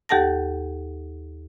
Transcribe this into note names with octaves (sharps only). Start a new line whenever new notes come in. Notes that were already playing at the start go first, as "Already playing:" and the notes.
D#2 G4 A4 F#5 A5 A#6